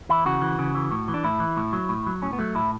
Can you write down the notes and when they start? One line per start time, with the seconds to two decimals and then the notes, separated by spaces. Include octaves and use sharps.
0.09 E3 E4
0.26 C#3 F#4
0.42 E3
0.59 C#3
0.75 E3
0.92 A2
1.08 E3
1.14 D4
1.24 A2 E4
1.40 E3
1.57 A2
1.73 F#3
1.89 A2
2.06 F#3
2.22 A2 C#4
2.33 B3
2.39 F#3 A3
2.55 A2 E4